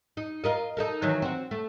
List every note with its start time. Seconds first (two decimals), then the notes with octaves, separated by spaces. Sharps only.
0.17 D#4
0.44 F4 A#4 D#5
0.77 D#4 A4 A#4
1.02 D#3 E3 F#3
1.22 C4 F#4
1.51 A3